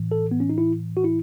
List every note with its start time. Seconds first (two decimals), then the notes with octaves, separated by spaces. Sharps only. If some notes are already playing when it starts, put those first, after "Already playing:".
Already playing: A2 E3
0.12 A4
0.31 B3
0.40 C#4
0.50 D#4
0.58 E4
0.97 F#4
1.04 E4